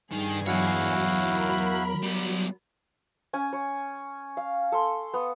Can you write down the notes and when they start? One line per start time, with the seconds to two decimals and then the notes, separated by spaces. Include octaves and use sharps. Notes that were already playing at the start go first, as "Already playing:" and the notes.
0.12 G2 D#3 G#4
0.47 E2 F#3 E4 F#4 C#5 F5
1.31 A#4 B5
2.03 G3 B3
3.33 C#4 G#5
3.53 C#5
4.37 F5
4.72 A4 C6
5.13 B3